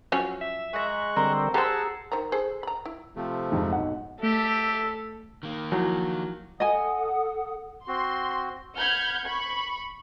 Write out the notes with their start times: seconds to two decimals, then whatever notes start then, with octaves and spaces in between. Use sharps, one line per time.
0.12 F3 F#3 C#4
0.41 E5
0.73 G#3 G#4 A#5 C#6 F#6
1.16 D3 G3 C4 A#4 C5 A#5
1.54 G4 G#4 C5 F#5 A5 A#5 C#6 E6
2.12 D#3 C5 A#5
2.32 G#4 A4 C5
2.63 A#5 B5
2.85 E4
3.16 C3 F3 A3
3.52 F2 G#2
3.73 B1 F#5
4.23 A3 G4 A4 E5
5.43 D#3 A#3
5.72 F3 F#3 E4
6.60 A4 D#5 F#5 G#5 D#6
7.88 C4 F#4 C6
8.76 F#5 B5 F6 G6 G#6
9.25 B5 C#6